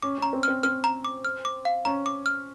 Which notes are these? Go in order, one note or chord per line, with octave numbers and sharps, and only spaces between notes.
C#4 D6
C#4 A#5
C4
C4 F6
C4 F6
A#5
D6
F6
D6
F5
C#4 A#5
D6
F6